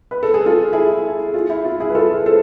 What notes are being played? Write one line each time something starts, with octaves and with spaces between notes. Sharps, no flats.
B4
A4
G#4
F4 A4
E4 G#4
F4
E4
F4
E4 G#4
B4
F4 A4
A4 C5